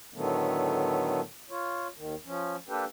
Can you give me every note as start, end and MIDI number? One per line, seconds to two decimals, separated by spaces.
0.14 1.21 45
0.14 1.21 50
0.14 1.21 51
0.14 1.21 54
0.14 1.21 57
0.14 1.21 59
1.50 1.87 65
1.50 1.87 73
1.97 2.15 39
1.97 2.15 51
2.25 2.56 53
2.25 2.56 61
2.69 2.85 58
2.69 2.85 62
2.69 2.85 67
2.69 2.85 69
2.69 2.85 71
2.69 2.85 79